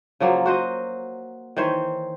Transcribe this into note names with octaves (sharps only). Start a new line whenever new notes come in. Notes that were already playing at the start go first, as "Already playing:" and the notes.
C#3 F3 F#3 A#3
F#4 C5 D#5
D#3 E3 C5 C#5